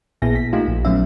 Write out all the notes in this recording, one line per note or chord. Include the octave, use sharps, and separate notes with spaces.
A#1 A#2 B3 E4 G#4 A#6
B6
A3 A#3 D#4 F4 G4
A#1
A#1 F#3 B3 C#4 E5